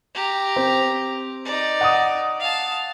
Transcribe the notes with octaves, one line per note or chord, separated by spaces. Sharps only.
G4 A#5
C4
D#4 D5
F#5 D#6
F5 A5